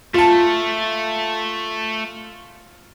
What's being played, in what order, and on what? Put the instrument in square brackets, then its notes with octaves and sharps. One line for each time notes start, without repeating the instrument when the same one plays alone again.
[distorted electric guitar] A3 [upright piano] F4 A5